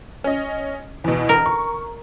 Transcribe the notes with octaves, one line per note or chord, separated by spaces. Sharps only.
C#4 D#5
E2 B2
A#4
C#6